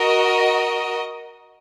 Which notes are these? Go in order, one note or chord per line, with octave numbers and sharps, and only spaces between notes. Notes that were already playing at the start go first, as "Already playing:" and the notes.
Already playing: F#4 A#4 D#5